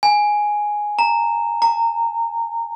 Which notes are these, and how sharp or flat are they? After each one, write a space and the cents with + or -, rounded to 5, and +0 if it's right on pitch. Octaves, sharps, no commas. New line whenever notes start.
G#5 +0
A#5 -15
A#5 -25